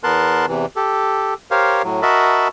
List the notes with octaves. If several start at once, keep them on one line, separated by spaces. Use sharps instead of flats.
E2 B3 A#4 A5 C6 F#6
E2 C3 E3
G4 A4
G4 A#4 C5 C#5 F5
A2 F#3
F#4 A#4 D#5 E5 A5 B5